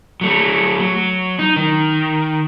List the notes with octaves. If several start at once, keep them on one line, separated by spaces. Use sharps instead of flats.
F#3 A3
F#3
D#4
D#3